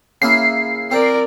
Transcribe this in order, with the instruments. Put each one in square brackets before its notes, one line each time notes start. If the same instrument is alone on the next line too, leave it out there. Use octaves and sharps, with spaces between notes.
[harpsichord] C#3 A#3 E4 [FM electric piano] C7
[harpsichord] C4 [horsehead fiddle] A#4 D5